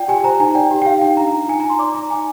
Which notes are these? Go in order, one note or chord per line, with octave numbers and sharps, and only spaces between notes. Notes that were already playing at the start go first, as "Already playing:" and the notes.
Already playing: F4 D5 G5
G4 G#5
C5 A#5
D#4 G#5
D5 G5
G4
G5
D#4 F5
D#4 G5
D4 A#5
F4
D#4 G#5
D#4 A#5
C6
D5 D6
D5 A#5
D#4 G#5